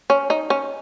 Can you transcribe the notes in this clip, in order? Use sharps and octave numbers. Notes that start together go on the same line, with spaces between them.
C#4
D#4
C#4